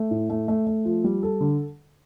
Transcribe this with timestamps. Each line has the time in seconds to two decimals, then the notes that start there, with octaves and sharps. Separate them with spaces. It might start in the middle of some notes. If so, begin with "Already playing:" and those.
Already playing: A3
0.11 A2
0.30 A3
0.48 A3
0.67 A3
0.85 F3
1.04 G3
1.23 A4
1.41 D3